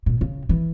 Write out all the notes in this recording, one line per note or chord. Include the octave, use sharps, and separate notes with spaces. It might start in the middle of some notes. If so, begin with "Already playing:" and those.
A#2
C#3
E3